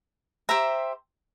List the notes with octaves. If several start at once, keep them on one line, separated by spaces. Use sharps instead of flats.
G4 C5 E5 A#5